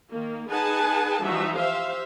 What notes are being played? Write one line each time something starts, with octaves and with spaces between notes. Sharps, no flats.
D#3 A#3
D#4 G#4 B4 F#5 G#5 A5
E3 F3 G3 D#4 F#4 E5
G4 C5 E5 F5